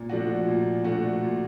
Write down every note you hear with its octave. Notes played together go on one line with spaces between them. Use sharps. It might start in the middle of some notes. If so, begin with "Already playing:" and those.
Already playing: A#2
F3 A3 D4 F#4
A#2
F3 A3 D4 F#4
A#2